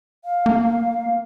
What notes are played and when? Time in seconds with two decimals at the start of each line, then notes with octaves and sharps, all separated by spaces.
0.24 F5
0.46 A#3